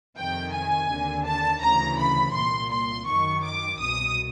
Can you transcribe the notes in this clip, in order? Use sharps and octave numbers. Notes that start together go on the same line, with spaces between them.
F2 C3 D#3 G5
G#5
D#2 D3
A5
D2 C#3 E3 A#5
B5
C2 A#2 C6
C6
F#2 D#3 C#6
D6
C2 B2 D#6